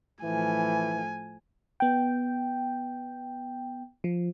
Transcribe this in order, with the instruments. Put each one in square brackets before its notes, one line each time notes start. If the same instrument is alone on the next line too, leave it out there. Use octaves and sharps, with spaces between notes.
[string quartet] A2 F3 A3 [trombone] E3 [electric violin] G#5
[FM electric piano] B3 G5
F3